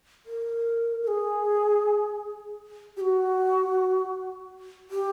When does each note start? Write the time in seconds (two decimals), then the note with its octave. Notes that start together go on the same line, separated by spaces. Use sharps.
0.26 A#4
1.03 A#4
1.07 G#4
2.97 G4
3.01 F#4
4.90 G4